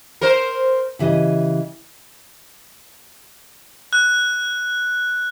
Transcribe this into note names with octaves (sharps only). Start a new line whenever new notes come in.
A#4 C5
C#3 E3 G4 D#5
F#6